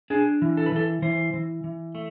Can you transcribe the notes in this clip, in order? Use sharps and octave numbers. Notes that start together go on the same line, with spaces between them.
D4 G#4
E3
A4
B4
E3 A4
E3 C5
E3
E3
A3